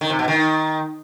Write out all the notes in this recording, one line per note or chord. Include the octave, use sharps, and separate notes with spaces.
D#3
C3
B2
D#3